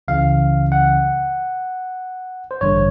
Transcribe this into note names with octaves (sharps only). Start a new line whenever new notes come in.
C#2 C#3 E3 F5
F#5
C5
A1 G2 D3 C#5